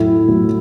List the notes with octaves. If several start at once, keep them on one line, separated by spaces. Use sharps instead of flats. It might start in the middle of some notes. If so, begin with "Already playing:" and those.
Already playing: A2 F#3 A3 E4
A2 F#3 A3